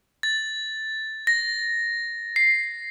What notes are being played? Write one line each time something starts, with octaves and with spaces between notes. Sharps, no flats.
A6
A#6
C7